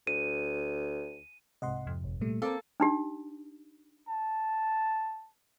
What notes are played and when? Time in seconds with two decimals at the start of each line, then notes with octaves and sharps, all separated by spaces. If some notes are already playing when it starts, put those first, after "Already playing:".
0.07 D2 D#7
1.62 C2 G#2 C3 D#5 F#5 C6
1.87 F2
2.04 G1
2.21 A#2 G3 A3
2.42 A#3 C4 A4 F5 D6
2.80 D4 D#4 G4
4.09 A5